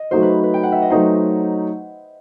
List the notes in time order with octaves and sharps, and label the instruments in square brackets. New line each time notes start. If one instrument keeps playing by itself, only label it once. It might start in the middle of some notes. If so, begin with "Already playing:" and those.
Already playing: [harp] D#5
[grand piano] F#3 A3 D#4 F#4 [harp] C5
[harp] B4
B4
G5
F#5
E5
D#5
[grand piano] F#3 A3 D#4 F#4 [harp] C5